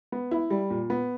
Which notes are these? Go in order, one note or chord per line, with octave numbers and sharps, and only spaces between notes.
B3
E4
G3
A#2
B3